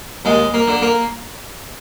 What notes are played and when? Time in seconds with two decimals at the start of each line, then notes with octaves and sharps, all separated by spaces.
0.25 D#2 G#3
0.54 A#3
0.68 D3
0.82 A#3